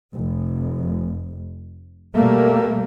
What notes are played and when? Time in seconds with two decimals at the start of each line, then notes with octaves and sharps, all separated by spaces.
0.16 F1
2.15 B2 G3 A3 A#3